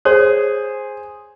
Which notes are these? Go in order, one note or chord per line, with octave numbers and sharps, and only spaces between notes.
G#4 C5 C#5